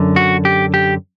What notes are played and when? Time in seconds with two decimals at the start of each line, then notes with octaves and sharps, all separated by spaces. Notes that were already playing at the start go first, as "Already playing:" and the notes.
Already playing: F#2 D3
0.16 F#4
0.45 G4
0.74 G4